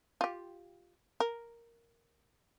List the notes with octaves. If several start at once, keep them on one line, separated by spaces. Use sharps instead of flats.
F4 G4
A#4